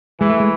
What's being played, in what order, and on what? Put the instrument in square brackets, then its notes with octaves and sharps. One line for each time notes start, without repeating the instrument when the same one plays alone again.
[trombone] E3 [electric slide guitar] G#3
[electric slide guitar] A3
G#3